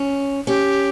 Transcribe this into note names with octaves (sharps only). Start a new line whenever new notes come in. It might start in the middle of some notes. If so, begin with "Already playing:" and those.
Already playing: C#4
C#4 G4